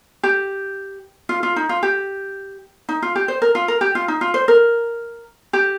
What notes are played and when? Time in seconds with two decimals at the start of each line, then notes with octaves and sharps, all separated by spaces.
0.23 G4
1.29 F4
1.43 F4
1.56 D#4
1.69 F4
1.83 G4
2.89 D#4
3.02 F4
3.16 G4
3.28 C5
3.42 A#4
3.55 F4
3.68 A#4
3.81 G4
3.95 F4
4.08 D#4
4.21 F4
4.34 C5
4.48 A#4
5.53 G4